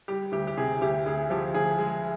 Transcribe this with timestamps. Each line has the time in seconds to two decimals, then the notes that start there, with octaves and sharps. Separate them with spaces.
0.08 G3 G4
0.32 D2 G4
0.47 G4
0.58 C3 G#4
0.81 D2 G4
1.06 D2 G#4
1.30 F3 G4
1.54 D2 G#4
1.79 G#3